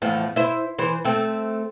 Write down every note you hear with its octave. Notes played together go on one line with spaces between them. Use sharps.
E2 A2 F3
E4 C5
E3 C5
A3 C4